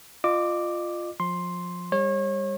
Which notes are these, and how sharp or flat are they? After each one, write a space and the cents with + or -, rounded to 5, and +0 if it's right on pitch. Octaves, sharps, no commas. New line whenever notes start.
F4 +0 D#5 -35 D6 +0
F3 +25 C6 +5
G3 +30 C#5 -35